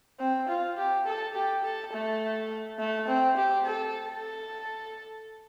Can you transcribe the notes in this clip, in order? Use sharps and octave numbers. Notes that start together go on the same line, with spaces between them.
C4
F4
G4
A4
G4
A4
A3
A3
C4
G4
A4
A4